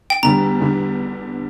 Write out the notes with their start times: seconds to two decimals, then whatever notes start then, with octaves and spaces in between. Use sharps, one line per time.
0.10 G5
0.23 E2 D3 G3 A#5
0.60 E2 D3 G3